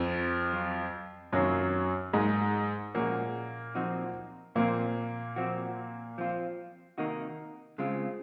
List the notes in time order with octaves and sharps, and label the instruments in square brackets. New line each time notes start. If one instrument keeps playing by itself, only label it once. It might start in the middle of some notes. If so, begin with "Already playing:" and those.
Already playing: [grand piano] F2 F3
[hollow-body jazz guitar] F#3 C4 F4
[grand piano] F#2 F#3 [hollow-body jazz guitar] C3 D#3 A#3 F4
[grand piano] G#2 G#3 [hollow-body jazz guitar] F#3 A#3 D#4
[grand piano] A#2 A#3 [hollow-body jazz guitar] F3 G#3 C#4 F#4
[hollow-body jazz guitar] F3 C4 D#4 F#4
[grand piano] A#2 A#3 [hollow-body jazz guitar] F3 C4 F4
[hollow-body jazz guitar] F3 C4 F#4
F3 C4 F4
C3 D#3 A#3 D#4 F#4
C#3 G#3 C4 F4